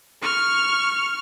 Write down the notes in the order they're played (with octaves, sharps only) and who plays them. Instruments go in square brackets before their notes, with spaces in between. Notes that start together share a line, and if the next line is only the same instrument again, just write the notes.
[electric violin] C#6 F6